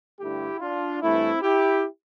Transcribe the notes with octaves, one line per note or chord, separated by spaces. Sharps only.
G2 D3 A3 E4 G4
D4 F4
G2 E3 A3 C4 E4
E4 G4